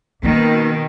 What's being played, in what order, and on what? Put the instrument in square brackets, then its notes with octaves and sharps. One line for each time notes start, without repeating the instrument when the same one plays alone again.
[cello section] B2 D#3 [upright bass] A#3 C#4